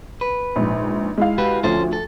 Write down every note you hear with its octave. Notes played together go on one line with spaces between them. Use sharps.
B4
A#1 G#2
G#3 E4 F5
F#4 G4 B4
D2 F3 C#4 A4 C5
A4